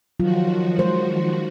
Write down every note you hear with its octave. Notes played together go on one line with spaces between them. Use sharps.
D#3 F3 F#3 F4 F#4
G#3 C5